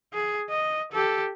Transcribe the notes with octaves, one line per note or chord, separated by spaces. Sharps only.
G#4
D#5
G4 A4